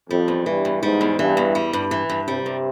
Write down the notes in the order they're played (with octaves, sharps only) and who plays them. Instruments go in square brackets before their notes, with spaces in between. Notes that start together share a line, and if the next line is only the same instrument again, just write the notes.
[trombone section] F2 [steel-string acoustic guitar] G3
[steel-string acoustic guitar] E2
[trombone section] G2 [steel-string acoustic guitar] E3
[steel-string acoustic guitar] E2
[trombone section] G#2 [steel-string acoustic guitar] G3
[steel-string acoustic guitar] E2
[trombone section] G2 [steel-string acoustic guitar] E3
[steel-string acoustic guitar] E2
G3
G2
E3
G2
[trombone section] C3 [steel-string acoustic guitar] G3
[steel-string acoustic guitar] G2